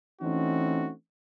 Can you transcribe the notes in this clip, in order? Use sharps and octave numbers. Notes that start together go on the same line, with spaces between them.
E3 A3 C4 C#4 D#4 F#4